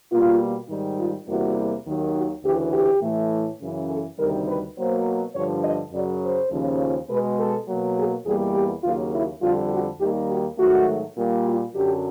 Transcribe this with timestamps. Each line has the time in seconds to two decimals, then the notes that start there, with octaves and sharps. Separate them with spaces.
0.10 B2 G3 A#3 F4
0.68 G#2 D#3 G3
0.97 F4
1.27 E2 C3 E3 G3 A#3 F#4
1.85 D#2 D#3 F#3
2.14 F#4
2.43 D2 C#3 E3 G4
2.72 G4
3.01 A2 E3 A3
3.59 F#2 C#3 E3
3.89 A4
4.18 D2 C3 D#3 G3 A#4
4.47 B4
4.76 B2 F#3 A#3 C5
5.34 G2 D3 F3 C#5
5.63 D#5
5.92 F#2 C#3 F#3 D5
6.21 C5
6.51 D#2 C#3 F3
7.09 B2 G#3 B4
7.38 A4
7.67 B2 F#3 A#3
7.96 G#4
8.25 E2 B2 G3 A#3 G#4
8.54 G4
8.83 D#2 C#3 F#3 A#3 F4
9.12 E4
9.42 F2 D3 G3 F4
9.70 F#4
10.00 D#2 D#3 G3 A#3 G4
10.29 F#4
10.58 G#2 D#3 F#3 A3 F#4
11.16 A#2 G3 A#3
11.45 F4
11.74 F#2 D3 F#3 G4